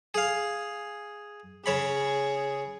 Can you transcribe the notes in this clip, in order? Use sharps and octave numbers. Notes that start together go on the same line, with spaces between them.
G#4 F5
C#3 G#4 C#5 B5